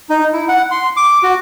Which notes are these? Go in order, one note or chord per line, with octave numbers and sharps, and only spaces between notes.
D#4
E4
F#5
C6
D6
F#4